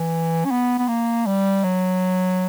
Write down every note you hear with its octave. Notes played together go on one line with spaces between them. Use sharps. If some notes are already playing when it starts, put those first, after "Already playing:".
Already playing: E3
C#4
B3
B3
A#3
G3
F#3